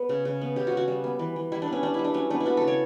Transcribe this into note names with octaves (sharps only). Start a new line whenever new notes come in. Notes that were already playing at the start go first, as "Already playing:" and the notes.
Already playing: B3
C#3
C#3
B3
C#3 G4
F#4
C#3
F#4
G3
B3
E3
E3
G3 E4
D4
B3
C#4
G3 D4
G3 E4
D4
F#3 C#4
B3 D4
E4
B3 F#4
C#3 A4
C#5